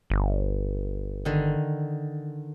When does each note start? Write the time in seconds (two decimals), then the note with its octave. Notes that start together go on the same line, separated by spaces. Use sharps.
0.10 G1
1.25 D3 D#3